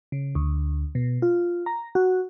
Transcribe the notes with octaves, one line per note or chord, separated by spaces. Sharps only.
C#3
D2
B2
F4
A#5
F#4